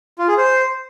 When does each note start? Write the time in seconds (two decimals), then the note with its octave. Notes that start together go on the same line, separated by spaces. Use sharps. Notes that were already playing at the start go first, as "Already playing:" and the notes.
0.19 F4
0.28 G#4
0.38 C5